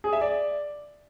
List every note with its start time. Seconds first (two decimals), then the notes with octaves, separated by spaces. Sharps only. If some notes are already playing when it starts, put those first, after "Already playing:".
0.04 G#4
0.13 E5
0.21 D5